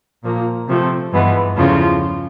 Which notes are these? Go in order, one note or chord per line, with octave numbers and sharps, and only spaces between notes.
A#2 F3 A#3
C3 F3 A3 C4
G2 E3 G#3 B3
E2 C#3 E3 F3 A3 F4